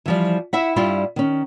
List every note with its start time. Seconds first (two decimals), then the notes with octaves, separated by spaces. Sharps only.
0.06 E3 F3 G3
0.53 E4 E5 F#5
0.76 G2 G3 E4 F4 G4
1.16 D#3 C#4